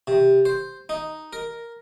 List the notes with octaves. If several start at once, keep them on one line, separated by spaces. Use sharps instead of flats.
C3
C5
D#4
A#4